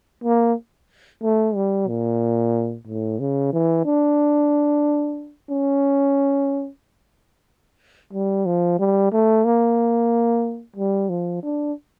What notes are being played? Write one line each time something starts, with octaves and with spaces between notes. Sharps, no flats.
A#3
A3
G3
A#2
A2
C#3
E3
D4
C#4
G3
F3
G3
A3
A#3
G3
F3
D4